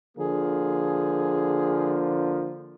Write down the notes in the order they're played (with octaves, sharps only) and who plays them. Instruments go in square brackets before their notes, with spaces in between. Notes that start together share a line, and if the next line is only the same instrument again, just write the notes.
[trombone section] D3 F3 A#3 [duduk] G#4